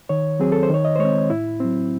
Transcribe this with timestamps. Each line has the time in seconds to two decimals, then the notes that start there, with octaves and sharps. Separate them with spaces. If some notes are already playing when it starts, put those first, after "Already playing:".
0.09 D#3 C#5
0.40 F#3 C4 G#4
0.52 A4
0.63 C5
0.70 D#3 C#5
0.85 D#5
0.96 C5
0.99 G#3 C4 C#5
1.30 A2 E4
1.60 F#3 C4